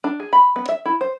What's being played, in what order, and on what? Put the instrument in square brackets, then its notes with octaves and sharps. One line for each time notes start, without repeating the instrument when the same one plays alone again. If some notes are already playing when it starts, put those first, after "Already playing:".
[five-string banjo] D4
G#4
B5
B3
E5
E4
C5